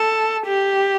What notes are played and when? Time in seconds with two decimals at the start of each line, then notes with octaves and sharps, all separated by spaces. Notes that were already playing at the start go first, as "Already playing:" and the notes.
Already playing: A4
0.47 G4